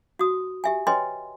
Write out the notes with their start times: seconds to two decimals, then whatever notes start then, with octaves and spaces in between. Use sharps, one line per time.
0.19 F#4 D#6
0.64 G4 E5 G#5
0.87 B4 C#5 D#5 G5 G#5 C6